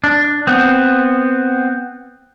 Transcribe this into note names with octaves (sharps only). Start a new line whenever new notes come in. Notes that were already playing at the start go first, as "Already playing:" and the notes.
D4
B3 C4